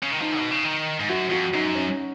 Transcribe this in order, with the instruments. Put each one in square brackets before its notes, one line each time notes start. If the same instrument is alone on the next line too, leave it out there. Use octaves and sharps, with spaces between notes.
[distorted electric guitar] C#3
D#3
[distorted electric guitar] F3 [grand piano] D#4
[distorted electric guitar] B2
C#3
D#3
G#2
[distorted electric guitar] F#2 [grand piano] F#4
[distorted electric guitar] F2 [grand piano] F#4
[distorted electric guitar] F#2 [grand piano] D#4
[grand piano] C#4